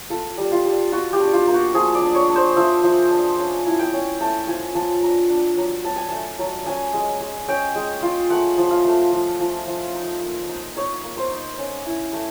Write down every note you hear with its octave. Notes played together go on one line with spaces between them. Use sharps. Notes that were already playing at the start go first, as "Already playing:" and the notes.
F4 A4
G3
F4
G3
F4 F#4
G4
D4
F4
A#3
F#4
F3 G#4
D5
D4
C#5
D4
C5
F3 E5
F3
D4
C#4
E4
G5
C#4
A3 A5
F3 G#5
F3 A5
D4 A#5
D4
F#3
F#3 A5
G#5
A3 A5
F#3
C#4 G#5
G#3
G#3
C#4 G5
G#3
F4
A3 F#5
F3
F5
A3
F3
F3
F3
D#4
A#3
D#4
D#4 C#5
A#3
C5
D#4
C#4
E4
A3